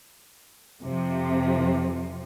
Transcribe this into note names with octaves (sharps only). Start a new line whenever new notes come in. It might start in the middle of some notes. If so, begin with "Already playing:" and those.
F2 C3 F3